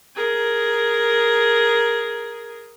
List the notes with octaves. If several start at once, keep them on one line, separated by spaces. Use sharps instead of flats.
G#4 A#4